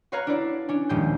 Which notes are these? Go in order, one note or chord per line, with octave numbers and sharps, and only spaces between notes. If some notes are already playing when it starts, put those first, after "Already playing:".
F#4 B4 C#5 F5 A#5 F#6
D4 E4 D5
C#4 D4
D#1 F3 G#3 G4 G6